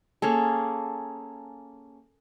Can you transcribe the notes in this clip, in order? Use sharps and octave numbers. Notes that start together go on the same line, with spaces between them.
A#3 C#4 G#4 A4